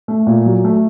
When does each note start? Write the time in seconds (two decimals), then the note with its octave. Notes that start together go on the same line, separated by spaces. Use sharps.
0.08 A3
0.27 A#2
0.46 F#3
0.64 A3